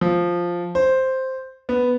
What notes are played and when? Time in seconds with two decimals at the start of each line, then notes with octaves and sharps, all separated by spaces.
0.01 F3
0.75 C5
1.69 B3